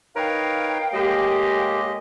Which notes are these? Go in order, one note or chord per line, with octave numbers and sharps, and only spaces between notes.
D#4 A#4 B4 C#5 F5 G5
A2 G#3 A#3 G4 D#5